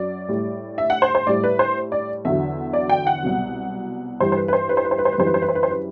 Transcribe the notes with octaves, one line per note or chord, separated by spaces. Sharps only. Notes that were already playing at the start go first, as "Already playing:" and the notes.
Already playing: F#2 F#3 D5
A2 G3
E5
F#5
C5
C5
A2 G3 D5
B4
C5
D5
E2 D3 F#3 E5
D5
G5
F#5
C2 B2 F#3
G2 E3 G3 C5
C5
B4
B4
C5
B4
C5
B4
C5
B4
C5
B4
F#2 E3 G3 C5
B4
C5
B4
C5
B4
C5
B4